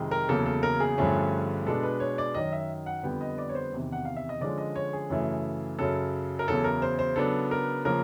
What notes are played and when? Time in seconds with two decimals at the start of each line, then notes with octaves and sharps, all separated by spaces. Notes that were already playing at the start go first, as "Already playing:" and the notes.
Already playing: F2 C3 D#3 G#3
0.11 A#4
0.28 E2 C#3 F#3 A#3 A4
0.46 A4
0.63 A#4
0.80 G#4
0.98 G2 D3 F3 A3 C#4
1.65 B2 G#3 B3 D4 A4
1.83 B4
2.00 C#5
2.18 D5
2.34 F#2 D#3 F#3 D#5
2.53 E5
2.86 F#5
3.03 F2 D3 G3 B3 G5
3.21 D#5
3.38 D5
3.49 C#5
3.55 C5
3.72 E2 C3 D#3
3.92 F#5
4.05 F5
4.16 E5
4.29 D#5
4.41 D3 F3 G#3 C#4 D5
4.58 D#5
4.76 C#5
4.93 G#4
5.10 F#2 C#3 E3 A3
5.79 F#2 C#3 F#3 A4
6.39 A#4
6.47 E2 C#3 F#3 A4
6.64 A#4
6.82 C5
6.99 C5
7.16 C#3 F#3 B3 D4 A4
7.51 A#4
7.85 C#3 F3 A#3 A#4